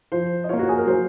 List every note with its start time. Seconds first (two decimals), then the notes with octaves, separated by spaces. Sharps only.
0.12 F3 C5
0.44 D#5
0.49 A#3 F4 C#5
0.59 F#4
0.69 G#4
0.78 A#4
0.87 F#3 C5